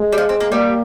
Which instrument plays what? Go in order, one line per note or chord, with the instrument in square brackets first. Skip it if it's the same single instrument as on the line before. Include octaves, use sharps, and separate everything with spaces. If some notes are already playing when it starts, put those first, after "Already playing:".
Already playing: [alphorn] G#3
[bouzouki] G3
F3
C4
A#3
[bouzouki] G3 [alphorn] A#3